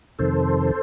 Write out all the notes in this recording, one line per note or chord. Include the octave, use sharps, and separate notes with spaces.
F2 C3 D#3 A4 C5